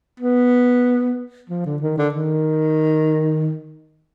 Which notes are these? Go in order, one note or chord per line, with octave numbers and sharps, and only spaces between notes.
B3
F3
D3
D#3
D3
D#3